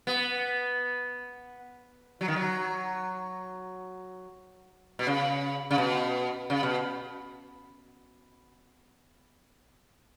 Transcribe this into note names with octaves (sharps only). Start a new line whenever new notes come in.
B3
F#3
D#3
F#3
B2
C#3
C#3
B2
C#3
B2